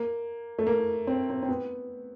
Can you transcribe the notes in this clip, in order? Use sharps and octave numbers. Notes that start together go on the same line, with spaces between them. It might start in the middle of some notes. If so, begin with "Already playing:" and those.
Already playing: A#3
A3
A#3
C4
C4
C4
B3